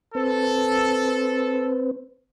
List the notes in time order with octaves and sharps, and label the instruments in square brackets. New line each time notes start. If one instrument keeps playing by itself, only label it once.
[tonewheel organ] C4 B4 C5 [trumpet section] A4